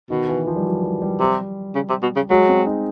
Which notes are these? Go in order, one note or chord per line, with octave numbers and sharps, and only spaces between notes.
B2 D#3
E3
F3
G3
F#3
G3
G3
C3
C#3
C3
B2
C#3
F#3 G#3
C4
D#4